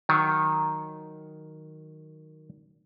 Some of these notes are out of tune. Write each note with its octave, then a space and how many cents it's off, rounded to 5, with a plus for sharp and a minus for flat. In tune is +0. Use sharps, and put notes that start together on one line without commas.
D#3 +0 F#3 +0